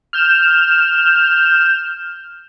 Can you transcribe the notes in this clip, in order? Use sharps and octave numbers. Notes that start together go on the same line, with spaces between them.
F6 G6 E7